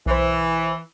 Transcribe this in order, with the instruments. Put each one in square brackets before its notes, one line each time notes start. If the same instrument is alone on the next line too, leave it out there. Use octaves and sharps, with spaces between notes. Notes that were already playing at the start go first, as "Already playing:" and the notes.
[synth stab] B1 C5 [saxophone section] E3